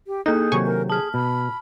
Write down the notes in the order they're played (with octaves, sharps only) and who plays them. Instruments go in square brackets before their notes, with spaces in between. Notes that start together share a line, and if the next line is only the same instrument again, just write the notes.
[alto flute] G4
[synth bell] A#3 A4 G6 [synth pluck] D#4 [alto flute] G#4
[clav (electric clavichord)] C3 D#3 F#3 [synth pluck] G#5 C#6
[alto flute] A#4
[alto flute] G#4 [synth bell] A5 F6
[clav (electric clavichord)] B2 [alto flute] B5